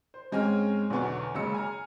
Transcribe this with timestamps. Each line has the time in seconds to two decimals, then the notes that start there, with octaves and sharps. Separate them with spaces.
0.14 C5
0.32 G#2 G#3 C4 C#4 G#5 F6
0.90 B1 E2 D3 B3 G#5 C#6
1.34 F#1 C#3 G#3 E6 C#7
1.54 G#5 A#5 F6